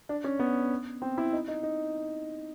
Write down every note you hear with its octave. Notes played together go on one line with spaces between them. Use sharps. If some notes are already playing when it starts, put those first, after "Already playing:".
D4
C#4
B3
C4
E4
D#4
D#4
D#4